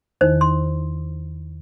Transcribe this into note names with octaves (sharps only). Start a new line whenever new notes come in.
E2 D#3 D#4 C5
C6